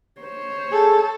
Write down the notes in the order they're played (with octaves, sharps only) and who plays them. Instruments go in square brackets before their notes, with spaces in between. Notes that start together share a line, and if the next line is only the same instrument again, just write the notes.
[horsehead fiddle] C5 C#5
[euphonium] G#4 [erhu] A4